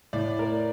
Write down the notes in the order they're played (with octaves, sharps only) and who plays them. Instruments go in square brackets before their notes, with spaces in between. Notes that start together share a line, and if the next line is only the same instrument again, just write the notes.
[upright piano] A2 D5
A#4